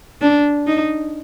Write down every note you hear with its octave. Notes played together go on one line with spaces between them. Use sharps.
D4
D#4